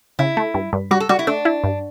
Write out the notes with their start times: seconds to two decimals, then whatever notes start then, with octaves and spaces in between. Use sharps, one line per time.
0.19 C#3 E4
0.37 A3
0.54 G2
0.73 G2
0.91 G3 F#4
1.00 A4
1.09 G3 F#4
1.19 E4
1.27 A3 D4
1.45 E4
1.64 G2